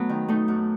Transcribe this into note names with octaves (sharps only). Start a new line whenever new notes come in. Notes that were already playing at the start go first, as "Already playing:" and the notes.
Already playing: F#3 A3 B3
D#3
A3 D#4
F#2